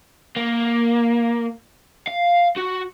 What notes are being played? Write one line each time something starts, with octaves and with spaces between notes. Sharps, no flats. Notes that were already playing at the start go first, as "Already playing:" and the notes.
A#3
F5
F#4